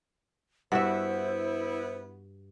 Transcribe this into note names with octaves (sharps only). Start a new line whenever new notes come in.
G2 B3 E4 F#4 C5 E5 F#5